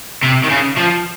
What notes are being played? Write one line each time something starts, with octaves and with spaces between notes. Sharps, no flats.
C3
D#3
C#3
F3